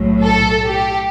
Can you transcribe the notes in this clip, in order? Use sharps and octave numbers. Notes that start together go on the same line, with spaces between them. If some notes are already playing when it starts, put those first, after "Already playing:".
Already playing: B1 A2 F#3
A4
G4